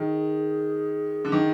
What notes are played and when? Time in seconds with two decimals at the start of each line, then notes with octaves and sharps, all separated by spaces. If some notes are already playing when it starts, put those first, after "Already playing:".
Already playing: D#3 G#4
1.25 D3
1.32 D#3